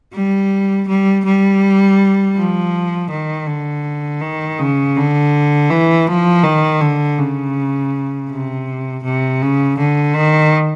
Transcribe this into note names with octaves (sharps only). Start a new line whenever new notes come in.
G3
G3
G3
F3
D#3
D3
D#3
C#3
D3
E3
F3
D#3
D3
C#3
C3
C3
C#3
D3
D#3